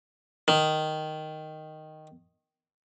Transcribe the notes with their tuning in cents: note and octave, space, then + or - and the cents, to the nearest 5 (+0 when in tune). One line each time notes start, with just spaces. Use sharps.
D#3 -5